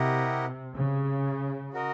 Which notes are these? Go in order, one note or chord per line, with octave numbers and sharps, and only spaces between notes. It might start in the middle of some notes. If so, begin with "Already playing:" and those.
Already playing: C3 E4 G4 A#4 D#5 F#5
C#3
F#4 A#4 D#5